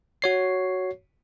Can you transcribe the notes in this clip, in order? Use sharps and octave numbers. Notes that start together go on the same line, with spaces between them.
F#4 C#5 C7